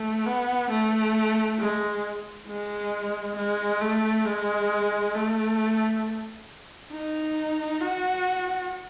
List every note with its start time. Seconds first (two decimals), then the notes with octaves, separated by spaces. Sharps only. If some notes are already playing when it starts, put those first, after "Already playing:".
Already playing: A3
0.25 B3
0.70 A3
1.58 G#3
2.47 G#3
3.36 G#3
3.81 A3
4.25 G#3
5.14 A3
6.92 D#4
7.80 F#4